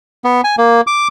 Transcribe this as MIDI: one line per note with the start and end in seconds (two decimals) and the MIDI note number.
0.24 0.41 59
0.44 0.56 80
0.58 0.81 58
0.87 1.08 86